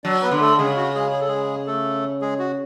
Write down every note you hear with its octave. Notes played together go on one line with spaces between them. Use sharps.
F#3 D4 D5
B3 B4
D3
A3 A4
C#3 G#3 G#4
F#4
G#3 G#4
G#4
A4
G#3 G#4
A3 A4
G#3 G#4
F#4